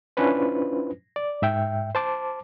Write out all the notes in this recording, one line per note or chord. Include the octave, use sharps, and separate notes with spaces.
C#4 D4 E4 F4 B4 C5
D5
G#2 E5 G5
C5 A5 D6